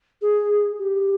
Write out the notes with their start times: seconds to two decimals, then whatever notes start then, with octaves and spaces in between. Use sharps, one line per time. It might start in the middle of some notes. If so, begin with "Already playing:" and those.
0.22 G#4
0.78 G4